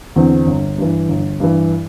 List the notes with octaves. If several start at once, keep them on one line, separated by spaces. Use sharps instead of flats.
E2 D3 C4
G1
G2 E3
G1
G2 E3